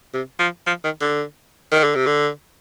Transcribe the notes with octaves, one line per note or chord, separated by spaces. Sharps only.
C3
F3
F3
D#3
D3
D#3
D3
C3
D3